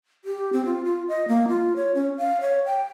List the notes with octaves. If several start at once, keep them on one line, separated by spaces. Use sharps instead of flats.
G4
C4
F4
F4
D#5
A#3
F4
C#5
C#4
F5
C#5
G5